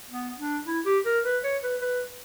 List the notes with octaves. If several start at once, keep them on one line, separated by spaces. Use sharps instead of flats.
B3
D4
E4
G4
A#4
B4
C#5
B4
B4